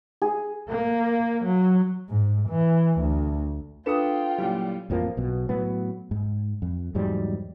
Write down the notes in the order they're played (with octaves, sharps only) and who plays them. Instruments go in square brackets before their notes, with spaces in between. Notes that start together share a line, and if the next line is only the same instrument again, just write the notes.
[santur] G#4
[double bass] A#3
F#3
G#2
E3
D2
[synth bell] D4 A4 B4 [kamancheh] F4 G5 [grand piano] D#6 C#7 E7
[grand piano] A#2 C#3 G3 [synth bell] F#3 E4
[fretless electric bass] A1 F2 F3 A#3
B1 B2
A2 F#3 B3
G#2
F2
E2 G#2 F#3 G3